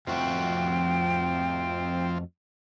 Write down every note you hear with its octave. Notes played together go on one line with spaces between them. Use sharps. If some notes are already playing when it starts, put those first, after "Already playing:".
F2 F3 A3 C4 F#4 G5